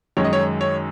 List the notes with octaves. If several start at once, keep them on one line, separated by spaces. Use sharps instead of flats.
F#2 D#3 G#3 D#4 C#5
D#5
C#5
C#5